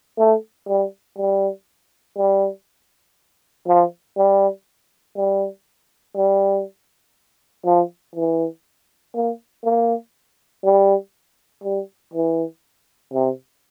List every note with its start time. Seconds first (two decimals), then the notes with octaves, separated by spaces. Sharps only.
0.18 A3
0.68 G3
1.18 G3
2.18 G3
3.67 F3
4.17 G3
5.17 G3
6.16 G3
7.66 F3
8.16 E3
9.15 A#3
9.64 A#3
10.65 G3
11.64 G3
12.14 E3
13.14 C3